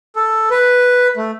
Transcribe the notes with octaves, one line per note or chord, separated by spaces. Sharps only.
A4
B4
A3